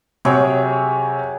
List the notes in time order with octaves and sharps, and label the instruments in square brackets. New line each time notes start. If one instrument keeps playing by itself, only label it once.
[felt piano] C3 C#5 [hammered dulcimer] F#3 G#4 G5